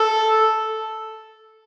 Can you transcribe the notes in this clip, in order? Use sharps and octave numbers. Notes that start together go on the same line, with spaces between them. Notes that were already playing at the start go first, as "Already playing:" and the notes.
Already playing: A4